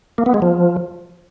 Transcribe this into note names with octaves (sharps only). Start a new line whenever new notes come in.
A#3
B3
G#3
F3